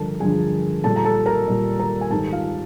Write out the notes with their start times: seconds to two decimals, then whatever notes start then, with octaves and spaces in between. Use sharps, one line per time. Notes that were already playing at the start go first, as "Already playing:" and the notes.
Already playing: G2 D3 F3 A4 A#4 A5
0.20 G2 D3 F3 G#4 G#5
0.84 A#2 G3 A4 A5
0.96 A#5
1.05 A4 A5
1.26 A#4 A#5
1.48 A#2 G3
1.79 A#4 A#5
2.01 G#5
2.10 G#2 D#3 G3 A4 A5
2.32 F4 F5